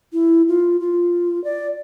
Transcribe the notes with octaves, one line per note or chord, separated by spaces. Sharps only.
E4
F4
F4
D5